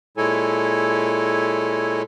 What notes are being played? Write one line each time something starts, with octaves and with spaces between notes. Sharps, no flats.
A#2 G#3 E4 A4 C#5 G#5